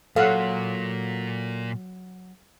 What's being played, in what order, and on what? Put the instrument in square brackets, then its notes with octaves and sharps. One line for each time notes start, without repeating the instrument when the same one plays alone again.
[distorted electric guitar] A#2 [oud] F#3 [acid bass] A4 [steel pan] F5 F#5